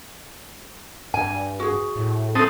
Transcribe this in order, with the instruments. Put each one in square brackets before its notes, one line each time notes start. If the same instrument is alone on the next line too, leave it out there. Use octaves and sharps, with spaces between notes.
[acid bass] G2 [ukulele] G#5
[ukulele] F#4 G#4
[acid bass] A2
[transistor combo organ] C4 A4 D#6